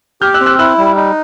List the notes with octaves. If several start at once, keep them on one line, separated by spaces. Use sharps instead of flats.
G4 F6 G6
E6 F#6
C4
E6 F#6
E4 E6 F#6
G3
D#4